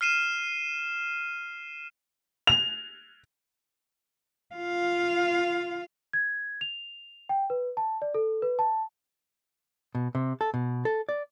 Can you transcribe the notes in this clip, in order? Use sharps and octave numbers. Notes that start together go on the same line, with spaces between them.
F6 C7 D#7 E7
F7
F4 F5
G#6
F7
G5
B4
A5
D5
A4
B4
A5
B2
C3
A4
B2
A4
D5